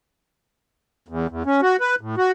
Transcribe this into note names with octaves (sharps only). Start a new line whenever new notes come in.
E2
E2
C#4
F#4
B4
A2
F#4